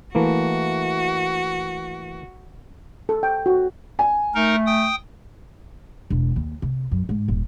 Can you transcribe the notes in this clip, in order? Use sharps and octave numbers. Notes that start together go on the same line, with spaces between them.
E3 A3 A#3 F#4
A4
G5
F#4
G#5
A3 D#4 A#4
G5 D#6
E1
D#2
C3
F#2
G#2
D#1